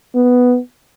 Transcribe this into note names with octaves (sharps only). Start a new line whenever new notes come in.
B3